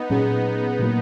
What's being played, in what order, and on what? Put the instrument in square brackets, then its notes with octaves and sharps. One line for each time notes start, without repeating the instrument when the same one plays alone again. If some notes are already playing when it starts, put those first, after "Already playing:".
Already playing: [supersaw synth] B3 D#4
[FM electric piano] A#2 F#3 C#4 G#4 [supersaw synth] B3
[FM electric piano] A#2 F#3 A#3